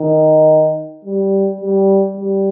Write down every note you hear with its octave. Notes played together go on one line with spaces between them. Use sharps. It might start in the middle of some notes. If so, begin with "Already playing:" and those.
Already playing: D#3
G3
G3
G3